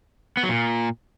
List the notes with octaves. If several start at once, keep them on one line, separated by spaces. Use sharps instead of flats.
B3
F#3
A#2